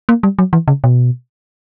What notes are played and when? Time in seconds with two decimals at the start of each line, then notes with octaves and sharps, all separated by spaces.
0.09 A#3
0.23 G3
0.39 F#3
0.53 E3
0.68 C#3
0.84 B2